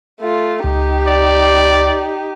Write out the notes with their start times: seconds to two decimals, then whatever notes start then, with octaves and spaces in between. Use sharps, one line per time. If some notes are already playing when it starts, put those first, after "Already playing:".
0.20 A3 F4
0.64 C#2 D#4 G4
1.08 D5